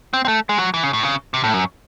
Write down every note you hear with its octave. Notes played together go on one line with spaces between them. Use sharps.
C4
C4
A3
G#3
F#3
E3
C#3
A2
C#3
C3
A2
F#2